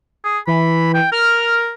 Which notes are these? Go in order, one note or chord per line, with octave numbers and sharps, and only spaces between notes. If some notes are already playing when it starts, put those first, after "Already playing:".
G#4
E3 B5
G5
A#4 F6